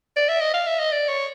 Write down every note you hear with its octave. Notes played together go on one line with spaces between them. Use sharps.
D5
E5
D#5
F5
E5
D#5
D5
C#5